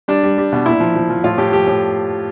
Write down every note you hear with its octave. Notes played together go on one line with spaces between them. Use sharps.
G3 D4
G3
G3
B2
A#2 E4
F3
F3
F3
A2 F4
A2 G4
F3 G4
A2